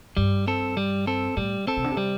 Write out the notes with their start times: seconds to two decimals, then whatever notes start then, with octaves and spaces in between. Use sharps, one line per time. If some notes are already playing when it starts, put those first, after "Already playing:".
0.17 G2 G3
0.48 C4 A4
0.77 G3
1.07 C4 A4
1.37 A2 G3
1.67 C4 A4
1.77 C3
1.84 D3
1.91 C3
1.97 G3